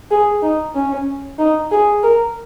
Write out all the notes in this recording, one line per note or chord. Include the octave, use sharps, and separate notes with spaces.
G#4
D#4
C#4
D#4
G#4
A#4